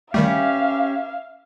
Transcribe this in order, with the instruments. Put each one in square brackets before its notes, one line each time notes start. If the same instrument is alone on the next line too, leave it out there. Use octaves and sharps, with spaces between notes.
[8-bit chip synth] D#3 G3 A3 [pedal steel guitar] C#4 G4 [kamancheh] E5 F5